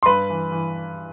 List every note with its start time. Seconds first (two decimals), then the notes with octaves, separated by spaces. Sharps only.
0.03 C6
0.06 G2 B4 B5
0.30 E3
0.52 E3